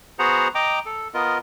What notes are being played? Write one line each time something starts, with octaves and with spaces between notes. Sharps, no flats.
B3 F#4 G#4 C5 F#5 A#5
D#5 G5 A#5 D6
A4
B3 F4 A#4 D#5